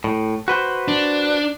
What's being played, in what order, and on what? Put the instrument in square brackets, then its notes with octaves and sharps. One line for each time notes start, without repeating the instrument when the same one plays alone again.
[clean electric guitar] A2
F#4 B4 C5
[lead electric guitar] D4